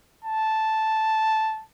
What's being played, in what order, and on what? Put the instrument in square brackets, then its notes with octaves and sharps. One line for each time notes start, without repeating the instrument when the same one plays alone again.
[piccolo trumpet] A5